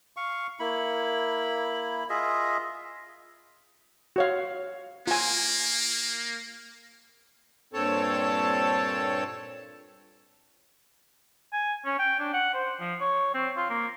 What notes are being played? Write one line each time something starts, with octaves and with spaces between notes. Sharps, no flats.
F5 C#6
A#3 E4 B5
F4 G#4 D#5 E5
F#4 C#5 F5
A#3 F4 G#5
G2 A#2 C4 A4 C#5 A5
G#5
C#4
G5
D4
F#5
C5
F3
C#5
C4
F4
A#3